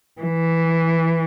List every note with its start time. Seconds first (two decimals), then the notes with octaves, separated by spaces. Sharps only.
0.21 E3